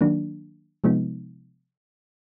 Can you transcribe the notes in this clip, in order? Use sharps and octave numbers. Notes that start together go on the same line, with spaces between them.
D#3 F#3 A#3 D4
C3 F3 G#3 B3 D#4